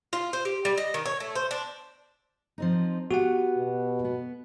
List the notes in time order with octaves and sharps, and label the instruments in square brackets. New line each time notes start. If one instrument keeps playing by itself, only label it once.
[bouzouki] F4
C5
G4
G3
D#5
D#3
C#5
A3
C5
D4
[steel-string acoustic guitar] F3 C4 D#4
[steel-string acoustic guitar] B3 [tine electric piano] F#4 G4 F#5
[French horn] B2
[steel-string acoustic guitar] B3